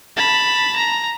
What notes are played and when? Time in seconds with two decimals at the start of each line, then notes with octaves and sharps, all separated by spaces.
0.16 A5 B5
0.76 A#5